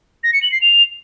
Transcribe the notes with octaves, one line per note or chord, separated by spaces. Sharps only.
A#6
C#7
F#7
C7
F7